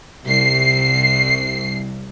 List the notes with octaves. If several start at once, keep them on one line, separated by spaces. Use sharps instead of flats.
C2 C7